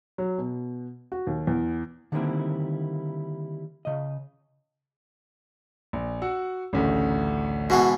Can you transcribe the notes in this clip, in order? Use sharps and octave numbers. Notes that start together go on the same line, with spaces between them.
F#3
B2
F#4
D#2
E2
D3 D#3 G3 A#3 C4 E4
C#3 D#5
A#1
F#4 F#5 E6
A1 D2 C#3 A3
G#2 B2 E3 F#4 F#5